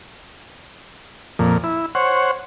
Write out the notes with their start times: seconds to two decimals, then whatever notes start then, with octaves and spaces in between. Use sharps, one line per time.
1.39 F2 A#2
1.64 E4
1.95 C5 C#5 F#5